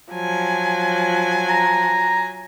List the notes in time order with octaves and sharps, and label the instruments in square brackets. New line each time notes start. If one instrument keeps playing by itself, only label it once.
[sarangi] F3 [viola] F#3 G#5
[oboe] A#5